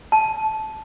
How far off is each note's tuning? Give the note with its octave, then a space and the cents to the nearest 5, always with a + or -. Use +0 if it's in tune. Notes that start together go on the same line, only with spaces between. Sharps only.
A5 -15